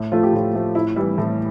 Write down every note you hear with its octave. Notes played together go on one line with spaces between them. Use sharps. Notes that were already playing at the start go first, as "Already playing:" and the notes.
Already playing: A2
F3 A3 F4
G4
A2 F4
F3 A3
A2 E4
E3 G3 E4
A2